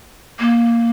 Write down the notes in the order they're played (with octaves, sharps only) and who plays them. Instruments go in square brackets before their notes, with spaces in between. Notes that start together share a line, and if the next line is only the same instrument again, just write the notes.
[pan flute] A#3